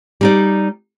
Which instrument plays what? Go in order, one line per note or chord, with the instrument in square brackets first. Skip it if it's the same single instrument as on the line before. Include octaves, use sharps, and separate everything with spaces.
[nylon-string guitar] G3 D#4 D5